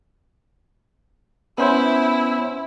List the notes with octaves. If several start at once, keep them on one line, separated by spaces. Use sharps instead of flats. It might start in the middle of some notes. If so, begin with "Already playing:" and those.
B3 C#4 E4 C5